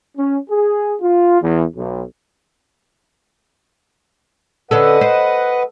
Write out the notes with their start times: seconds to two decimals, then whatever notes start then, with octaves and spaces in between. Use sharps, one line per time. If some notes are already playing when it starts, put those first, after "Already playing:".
0.16 C#4
0.49 G#4
1.01 F4
1.41 E2
1.75 B1
4.71 D3 C#4 A4 B4 D#5 F#5
5.01 C5